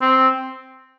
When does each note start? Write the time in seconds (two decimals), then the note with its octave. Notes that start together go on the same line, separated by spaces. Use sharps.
0.01 C4